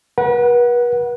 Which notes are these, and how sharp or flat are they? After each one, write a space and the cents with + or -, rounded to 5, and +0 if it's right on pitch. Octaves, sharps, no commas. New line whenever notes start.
B4 -40 F#5 +0